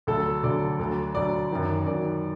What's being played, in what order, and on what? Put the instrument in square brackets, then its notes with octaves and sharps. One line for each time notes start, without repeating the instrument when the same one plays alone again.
[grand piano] D2 D3 F#3 A4
D2 D3 F#3 D5
D2 D3 F#3
D2 D3 F#3 D5
F#2 D#3 F#3
F#2 D#3 F#3 D5